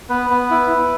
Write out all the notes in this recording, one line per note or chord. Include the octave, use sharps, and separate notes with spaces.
B3 B4
B3
E4
E4